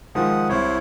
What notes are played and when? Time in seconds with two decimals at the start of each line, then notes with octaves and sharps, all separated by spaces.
0.15 D#3 F3 G#3 F#5 D#6
0.49 C2 E4 C5 C#5